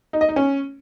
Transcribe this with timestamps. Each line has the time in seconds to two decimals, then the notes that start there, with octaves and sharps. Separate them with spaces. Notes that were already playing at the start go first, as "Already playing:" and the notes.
0.13 D#4
0.21 D#5
0.29 D#4
0.36 C#4